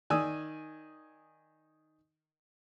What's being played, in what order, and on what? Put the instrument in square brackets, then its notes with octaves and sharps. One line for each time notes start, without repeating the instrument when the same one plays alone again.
[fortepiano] D#3 D5 G#5 D#6 E6